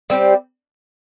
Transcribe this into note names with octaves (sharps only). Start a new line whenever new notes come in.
G3 C4 G4